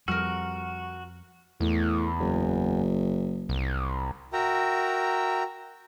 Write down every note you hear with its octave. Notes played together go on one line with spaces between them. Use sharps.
F2 G3 F#4 A#4 F6
E2 A2
F#1
C2
F#4 A#4 E5 G5 A#5